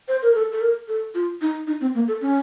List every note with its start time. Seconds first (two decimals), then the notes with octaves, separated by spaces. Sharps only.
0.08 C5
0.22 A#4
0.35 A4
0.52 A4
0.61 A#4
0.88 A4
1.15 F4
1.41 D#4
1.67 D#4
1.81 C4
1.95 A#3
2.08 A4
2.21 C#4